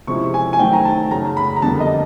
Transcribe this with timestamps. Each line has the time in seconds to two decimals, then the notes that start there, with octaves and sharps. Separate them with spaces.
0.07 C3 F3 G#3 C#4 E4 C#6
0.34 G#5
0.53 G#5
0.59 D#3 F#3 A3 C4 G5
0.73 A#5
0.85 A5
1.11 F#2 C#3 F#3 A#5
1.37 B5
1.56 A#5
1.62 F2 D3 G3 A#3 A5
1.80 D#5